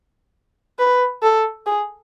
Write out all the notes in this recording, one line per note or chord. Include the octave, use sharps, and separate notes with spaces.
B4
A4
G#4